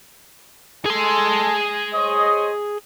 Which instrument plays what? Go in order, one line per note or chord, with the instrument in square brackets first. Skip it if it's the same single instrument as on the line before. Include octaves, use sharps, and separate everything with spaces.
[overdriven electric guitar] G#4 C6 [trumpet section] A4 G#5
[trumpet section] C5 C#5 D#5